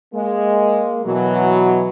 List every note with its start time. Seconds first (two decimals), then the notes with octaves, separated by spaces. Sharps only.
0.14 G#3 A#3
1.06 B2 E3 F#3